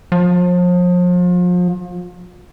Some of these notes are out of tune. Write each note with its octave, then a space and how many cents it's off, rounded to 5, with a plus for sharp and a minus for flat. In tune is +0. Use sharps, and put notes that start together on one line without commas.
F3 +35